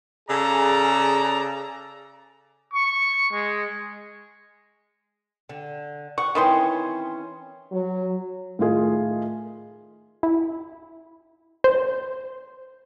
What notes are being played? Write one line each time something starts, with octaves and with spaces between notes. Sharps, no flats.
C#3 G#4 A4 D5 A#5
C#6
G#3
D3
F#5 C#6
D#3 E3 C4 C#4 C6
F#3
A2 D#3 F4 G#4
E4
C5